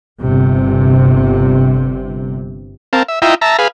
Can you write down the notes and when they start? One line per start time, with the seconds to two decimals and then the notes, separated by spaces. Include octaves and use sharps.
0.20 G1 C3
2.93 C4 A#4 F5 A5
3.08 E5
3.22 E4 F4 D#5 E5 G5 A#5
3.41 E5 A5 A#5
3.59 G#4 B4 F5